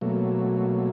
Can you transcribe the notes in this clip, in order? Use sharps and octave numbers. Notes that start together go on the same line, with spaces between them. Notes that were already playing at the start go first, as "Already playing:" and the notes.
B2 F#3 A3 A#3